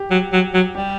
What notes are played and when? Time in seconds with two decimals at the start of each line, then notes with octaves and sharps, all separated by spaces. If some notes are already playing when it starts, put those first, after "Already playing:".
Already playing: G4
0.11 F#3
0.33 F#3
0.54 F#3
0.75 G3 G4